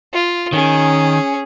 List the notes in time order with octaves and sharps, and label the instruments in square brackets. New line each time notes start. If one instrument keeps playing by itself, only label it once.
[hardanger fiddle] F4
[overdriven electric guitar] D#3 [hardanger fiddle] C#4 G#4